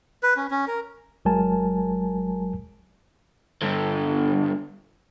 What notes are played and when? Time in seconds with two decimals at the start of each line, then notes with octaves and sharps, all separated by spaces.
0.23 B4
0.37 C#4
0.51 C#4
0.68 A#4
1.25 G1 F#3 G#3 A#4 G#5 A5
3.62 G2 D3